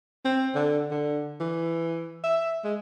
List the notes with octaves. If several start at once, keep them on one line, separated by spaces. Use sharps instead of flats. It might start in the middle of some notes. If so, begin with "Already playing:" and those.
C4
D3
D3
E3
E5
G#3